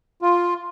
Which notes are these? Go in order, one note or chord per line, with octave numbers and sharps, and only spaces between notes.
F4